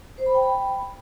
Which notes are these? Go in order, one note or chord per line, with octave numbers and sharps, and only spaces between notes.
C5
B5
G5
B5